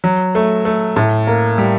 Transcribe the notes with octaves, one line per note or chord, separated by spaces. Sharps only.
F#3
A3
A3
A2
A#3
G3